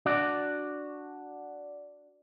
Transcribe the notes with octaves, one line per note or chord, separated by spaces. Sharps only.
D4 F#4 D5